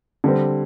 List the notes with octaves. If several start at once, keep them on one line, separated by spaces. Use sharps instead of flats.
D3 G3 C4